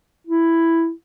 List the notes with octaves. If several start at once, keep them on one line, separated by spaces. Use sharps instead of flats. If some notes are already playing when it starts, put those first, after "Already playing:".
E4